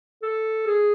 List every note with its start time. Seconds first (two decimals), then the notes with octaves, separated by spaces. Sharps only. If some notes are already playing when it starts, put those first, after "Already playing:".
0.23 A4
0.67 G#4